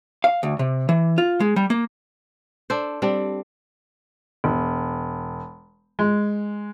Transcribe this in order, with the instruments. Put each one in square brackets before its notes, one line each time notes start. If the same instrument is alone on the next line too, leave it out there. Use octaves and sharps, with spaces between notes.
[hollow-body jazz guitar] F5
D2
C3
E3
F4
G#3
G3
A#3
[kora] D4 A4 C5
G3 C4 D4
[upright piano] E1
G#3